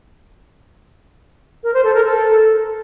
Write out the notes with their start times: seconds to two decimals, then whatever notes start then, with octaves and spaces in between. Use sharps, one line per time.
1.64 A#4
1.74 C5
1.84 A4
1.94 A#4
2.04 A4